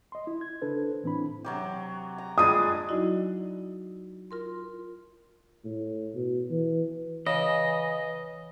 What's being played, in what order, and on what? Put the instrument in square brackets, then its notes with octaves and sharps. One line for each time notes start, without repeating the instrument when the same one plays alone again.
[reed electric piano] D#5 C6
E4
G#6
C#3 D4 A4 B4 C5
A2 E3 C4 D4 E4 B5
[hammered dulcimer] C3 F#3 G4
A#5
[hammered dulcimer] G3 G#3 D4 [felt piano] D#6 D#7
[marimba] F#3 D#4 E4 F#4 D5 D#5
F4 A#4 C6
[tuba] A2
B2
E3
[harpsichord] C#3 [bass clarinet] E3 [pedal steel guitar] D#5